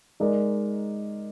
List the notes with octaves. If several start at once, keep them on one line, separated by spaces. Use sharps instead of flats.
G#3 D#4 A#4 D5